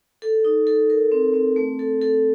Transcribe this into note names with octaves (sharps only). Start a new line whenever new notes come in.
A4
D#4
A4
A#4
C4
C4
A3
A4
A4